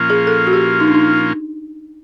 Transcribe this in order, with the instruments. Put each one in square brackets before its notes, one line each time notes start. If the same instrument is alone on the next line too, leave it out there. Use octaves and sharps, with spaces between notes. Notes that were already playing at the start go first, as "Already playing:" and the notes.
Already playing: [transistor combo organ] A#2 F3 A#3 C#4 F4
[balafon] G#4
A4
F#4
G4
D#4
D4
D#4